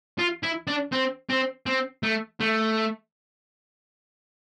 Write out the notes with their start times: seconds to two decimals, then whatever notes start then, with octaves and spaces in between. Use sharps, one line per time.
0.19 F4
0.43 E4
0.67 D4
0.92 C4
1.29 C4
1.66 C4
2.03 A3
2.40 A3